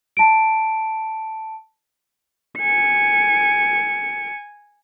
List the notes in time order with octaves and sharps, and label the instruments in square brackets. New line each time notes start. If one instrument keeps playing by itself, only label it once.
[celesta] A5 D7
[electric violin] G#5 C#7